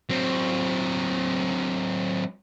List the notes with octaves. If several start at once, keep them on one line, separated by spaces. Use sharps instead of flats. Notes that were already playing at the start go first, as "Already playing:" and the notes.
F#3 C4